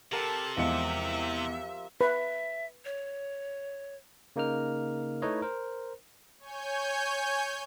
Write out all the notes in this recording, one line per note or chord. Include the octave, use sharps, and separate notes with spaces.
C3 G4 A4 A#4 F#5 A5
E2 F3 G#3 C4 E5 C#7
B4 E5
C#5
C#3 A#3 D#4 A#4 F6
A3 D#4 E4 B4 C#5 D#5
A#4 C5
C#5 G#5 G6